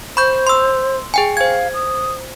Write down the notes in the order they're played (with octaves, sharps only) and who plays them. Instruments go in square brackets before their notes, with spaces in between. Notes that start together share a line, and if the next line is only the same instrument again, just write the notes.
[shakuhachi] C5 [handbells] B5 C#6 G6
[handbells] C6 E6
G#4 G5 G#5
[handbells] C5 G#6 [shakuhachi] F5
[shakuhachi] D#6